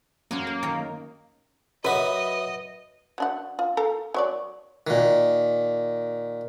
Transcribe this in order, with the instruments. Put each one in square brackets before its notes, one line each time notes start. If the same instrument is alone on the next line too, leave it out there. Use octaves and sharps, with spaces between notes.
[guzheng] F#2 C#5 G#5 [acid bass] A#3
[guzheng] A#4
D#3 C#5 G5
[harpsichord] F#2 F#4 [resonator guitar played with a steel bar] B4 [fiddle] D#5 [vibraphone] E5
[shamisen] F#3 D4 F#5
F4
A4 F5 A#5
F#3 C#5 D5
[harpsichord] A#2 D#3